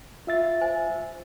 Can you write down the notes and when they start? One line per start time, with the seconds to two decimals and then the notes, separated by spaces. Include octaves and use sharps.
0.27 F4 E5 A6
0.61 C5 G#5